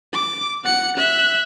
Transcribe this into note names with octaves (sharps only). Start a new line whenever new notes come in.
D6
F#5 C#7
E5 F#6